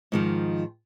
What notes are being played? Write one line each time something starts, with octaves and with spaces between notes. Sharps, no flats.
G#2 D#3 F3